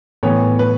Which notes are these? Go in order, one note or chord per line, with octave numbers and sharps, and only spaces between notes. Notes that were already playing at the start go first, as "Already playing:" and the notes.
A2 E3 B3 C#5
B4